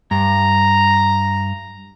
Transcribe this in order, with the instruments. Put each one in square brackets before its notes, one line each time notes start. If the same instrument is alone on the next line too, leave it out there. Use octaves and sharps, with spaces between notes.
[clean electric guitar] G2 [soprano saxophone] A#5